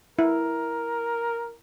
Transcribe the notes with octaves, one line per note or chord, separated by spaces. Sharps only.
E4 A#4